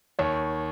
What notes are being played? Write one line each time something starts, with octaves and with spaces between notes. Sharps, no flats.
D#2 C#5